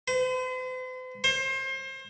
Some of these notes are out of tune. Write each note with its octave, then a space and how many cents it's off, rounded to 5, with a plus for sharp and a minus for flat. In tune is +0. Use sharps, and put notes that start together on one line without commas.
C5 -45
C5 +30